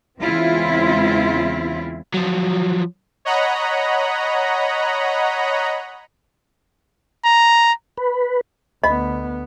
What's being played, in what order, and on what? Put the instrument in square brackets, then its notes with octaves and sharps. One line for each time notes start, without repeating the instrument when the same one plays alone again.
[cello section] E2 C#3 G#3 C4 E4 F4
[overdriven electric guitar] F3 F#3
[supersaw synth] C#5 D#5 F#5 A#5 B5
[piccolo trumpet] A#5
[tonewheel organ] B4
[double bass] D2 B3 [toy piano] D#5 [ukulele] B5